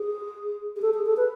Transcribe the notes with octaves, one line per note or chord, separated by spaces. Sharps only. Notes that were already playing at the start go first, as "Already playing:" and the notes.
Already playing: G#4
G#4
A4
G#4
A4
B4